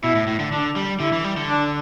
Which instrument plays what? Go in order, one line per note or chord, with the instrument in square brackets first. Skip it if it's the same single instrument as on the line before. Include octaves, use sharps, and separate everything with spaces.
[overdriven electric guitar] B2 [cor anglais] E4
[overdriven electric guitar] A2
A2
D3
[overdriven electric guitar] D3 [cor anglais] D4
[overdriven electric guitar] G3
[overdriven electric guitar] D3 [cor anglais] E4
[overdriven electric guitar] E3
G3
D3
[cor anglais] D4